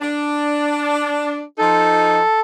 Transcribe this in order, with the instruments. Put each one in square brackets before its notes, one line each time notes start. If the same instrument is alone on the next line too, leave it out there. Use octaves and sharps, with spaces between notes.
[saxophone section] D4
[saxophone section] F3 D#4 [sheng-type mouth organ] A4